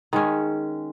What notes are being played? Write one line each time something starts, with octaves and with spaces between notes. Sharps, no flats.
D#3 G#3 C#4